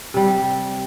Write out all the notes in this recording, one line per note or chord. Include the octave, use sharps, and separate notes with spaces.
C3 G3